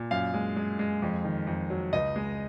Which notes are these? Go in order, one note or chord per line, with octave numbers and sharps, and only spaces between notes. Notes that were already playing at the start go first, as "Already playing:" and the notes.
Already playing: A#2
F#2 F5
G#3
G#3
G#3
F2
D#3
F2
F#3
C#2 D#5
G#3